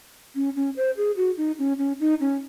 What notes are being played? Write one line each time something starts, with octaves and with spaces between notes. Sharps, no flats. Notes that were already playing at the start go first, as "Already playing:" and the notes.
C#4
C#4
C5
G#4
F#4
D#4
C#4
C#4
D#4
C#4